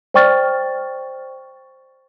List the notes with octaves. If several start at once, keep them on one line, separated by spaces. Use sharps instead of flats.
C5 D5 G5 C#6 F6 A6